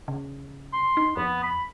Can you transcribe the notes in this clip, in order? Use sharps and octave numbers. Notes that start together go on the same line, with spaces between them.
C#3
C6
D#4
F2 B3
B5